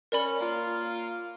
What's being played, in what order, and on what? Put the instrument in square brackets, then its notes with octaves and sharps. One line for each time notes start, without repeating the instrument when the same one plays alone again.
[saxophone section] C#4 [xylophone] A#4 D5 B5
[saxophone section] A#3 F4